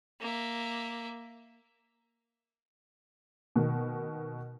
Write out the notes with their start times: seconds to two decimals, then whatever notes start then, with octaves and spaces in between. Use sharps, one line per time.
0.21 A#3 E5
3.56 B2 D#3